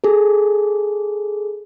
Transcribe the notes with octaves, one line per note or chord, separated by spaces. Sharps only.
G#4 A4